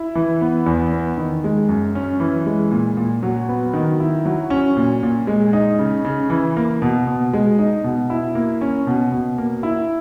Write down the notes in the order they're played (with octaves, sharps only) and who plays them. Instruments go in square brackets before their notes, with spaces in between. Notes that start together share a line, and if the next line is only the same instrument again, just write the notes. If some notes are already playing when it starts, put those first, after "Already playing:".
Already playing: [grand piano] E4
E3
B3
E2
B3
D#3
G#3
F#2
C#4
E3
G#3
A#2
A#2
F#3
B3
D#3
E4
F#3
C#4
A#2
A#2
G#3
D#4
C#3
C#3
E3
A#3
B2
B2
G#3
D#4
B2
E4
A#3
C#4
B2
B2
A#3
E4